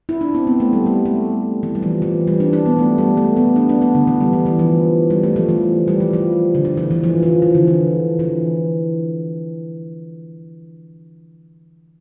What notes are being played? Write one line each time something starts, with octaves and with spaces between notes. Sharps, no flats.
E4
D4
C4
B3
A3
G3
G3
A3
E3
G3
F3
E3
G3
D4
D4
B3
A3
G3
A3
B3
D4
D4
B3
D3
E3
G3
E3
E3
F3
G3
A3
F3
E3
G3
F3
F3
D3
E3
E3
E3
F3
F3
E3
D3
D3
E3